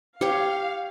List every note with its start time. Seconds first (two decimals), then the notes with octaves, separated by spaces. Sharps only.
0.21 G4 C#5 F5